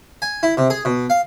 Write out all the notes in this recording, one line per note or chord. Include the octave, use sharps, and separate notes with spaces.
G#5
E4
C3
G#4
B2
F5